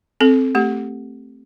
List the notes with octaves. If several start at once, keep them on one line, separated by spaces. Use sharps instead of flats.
C4 A4
A3 G4